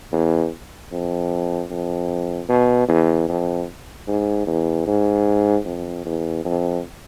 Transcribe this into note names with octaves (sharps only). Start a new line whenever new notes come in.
E2
F2
F2
B2
E2
F2
G#2
E2
G#2
F2
E2
F2